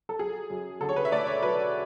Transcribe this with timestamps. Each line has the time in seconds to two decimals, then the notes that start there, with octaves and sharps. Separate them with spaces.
0.09 A4
0.19 F#3 G#4
0.50 F#2
0.81 D3 A4
0.89 C#5
0.96 B4
1.05 E5
1.12 A3 D5
1.27 C#5
1.42 F#3 B4